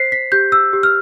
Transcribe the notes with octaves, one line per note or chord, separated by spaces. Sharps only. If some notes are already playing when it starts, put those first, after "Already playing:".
Already playing: C5 B6 C7
B6
G4 G6
E6
G4
F6